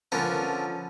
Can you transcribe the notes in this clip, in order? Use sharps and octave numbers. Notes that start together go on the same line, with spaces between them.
D3 F3 C#4 A#4 B4